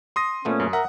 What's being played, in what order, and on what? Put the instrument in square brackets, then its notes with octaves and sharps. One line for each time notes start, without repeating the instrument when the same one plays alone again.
[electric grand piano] C6 D#6 A#6
[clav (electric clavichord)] A#2 A3 B3 [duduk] C#4
[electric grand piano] F#2
[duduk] A#4 [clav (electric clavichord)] E5 [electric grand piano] F#5